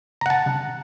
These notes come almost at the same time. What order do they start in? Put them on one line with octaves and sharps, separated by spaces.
A#5 F#5 A5